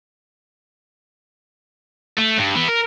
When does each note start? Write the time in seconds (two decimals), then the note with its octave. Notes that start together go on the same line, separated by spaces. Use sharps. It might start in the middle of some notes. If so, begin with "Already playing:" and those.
2.18 A3
2.38 G2
2.56 E3 B3
2.68 A#4